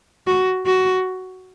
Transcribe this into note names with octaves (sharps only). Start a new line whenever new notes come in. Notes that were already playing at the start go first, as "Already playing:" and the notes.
F#4
F#4